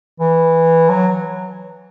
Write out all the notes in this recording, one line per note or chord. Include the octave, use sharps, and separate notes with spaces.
E3
F#3